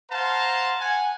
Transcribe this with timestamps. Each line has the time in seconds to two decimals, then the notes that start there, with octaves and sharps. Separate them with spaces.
0.11 C5 F5 F#5 A5 A#5
0.80 F#5 G#5